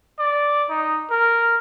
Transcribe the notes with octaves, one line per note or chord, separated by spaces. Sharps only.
D5
D#4
A#4